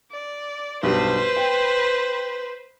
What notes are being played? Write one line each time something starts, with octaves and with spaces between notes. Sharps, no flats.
D5
B1 G2 B4 C5
G5